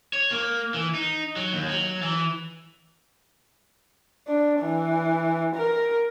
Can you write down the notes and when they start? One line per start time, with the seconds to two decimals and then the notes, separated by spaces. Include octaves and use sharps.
0.13 C#5
0.31 A#3
0.74 E3
0.95 D#4
1.36 F#3
1.53 D#2
1.68 F#3
2.02 E3
4.28 D4
4.60 E3
5.55 A#4